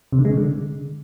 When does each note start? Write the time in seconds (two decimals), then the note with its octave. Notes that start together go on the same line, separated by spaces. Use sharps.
0.12 C3
0.19 D3
0.25 G#3
0.31 C#3
0.37 D3